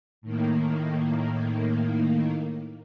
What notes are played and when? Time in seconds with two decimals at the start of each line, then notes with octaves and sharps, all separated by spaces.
0.21 A2 D#3 A#3